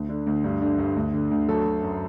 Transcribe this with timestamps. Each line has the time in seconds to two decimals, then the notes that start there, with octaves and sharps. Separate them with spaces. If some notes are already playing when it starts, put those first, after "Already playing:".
Already playing: D2
0.09 D3
0.26 D2
0.44 G2
0.61 D3
0.79 G2
0.96 D2
1.13 D3
1.31 D2
1.49 F#3 A4
1.65 F#3
1.83 F#2